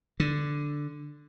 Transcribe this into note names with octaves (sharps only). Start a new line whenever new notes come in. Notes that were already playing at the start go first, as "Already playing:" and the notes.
D3